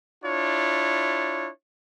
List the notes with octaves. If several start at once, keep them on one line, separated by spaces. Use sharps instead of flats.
D4 E4 F4 C#5